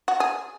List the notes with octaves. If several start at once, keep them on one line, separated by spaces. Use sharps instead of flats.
F#4
G#4